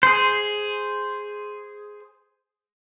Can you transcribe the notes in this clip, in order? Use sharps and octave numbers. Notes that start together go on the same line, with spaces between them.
G#4 C5